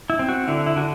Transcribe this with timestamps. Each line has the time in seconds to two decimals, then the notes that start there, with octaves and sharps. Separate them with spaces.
0.10 E4
0.19 C4
0.29 F#4
0.48 D3 E4
0.66 E4
0.76 D3 F#4